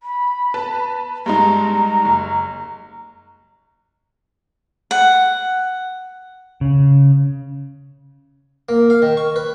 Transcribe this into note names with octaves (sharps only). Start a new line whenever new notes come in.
B5
B4 A5
G2 G#3 D#4 A#5
F#1
F#5
C#3
A#3
F5
D#3
C#6
B4